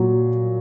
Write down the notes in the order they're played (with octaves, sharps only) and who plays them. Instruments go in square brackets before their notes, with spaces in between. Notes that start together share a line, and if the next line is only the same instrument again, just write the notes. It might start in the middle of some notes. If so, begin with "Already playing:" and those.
Already playing: [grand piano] A#2 F#3